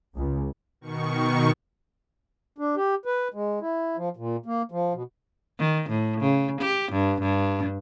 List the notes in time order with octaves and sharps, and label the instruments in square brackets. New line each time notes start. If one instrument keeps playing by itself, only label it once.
[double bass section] C#2
[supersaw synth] B2 D#3 C#6
[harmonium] D4
G4
B4
G#3
E4
F3
A#2
A#3
F3
B2
[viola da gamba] D#3
A2
C#3
G4
G2
G2